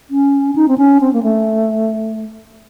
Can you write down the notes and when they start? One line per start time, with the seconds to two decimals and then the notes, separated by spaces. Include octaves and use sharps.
0.10 C#4
0.56 D#4
0.68 C4
0.78 C#4
1.01 C4
1.13 A#3
1.23 A3